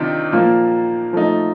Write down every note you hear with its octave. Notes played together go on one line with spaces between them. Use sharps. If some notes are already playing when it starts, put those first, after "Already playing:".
Already playing: C3 D#3 D4 F4
A#2 F3 A#3
F3 A3 D#4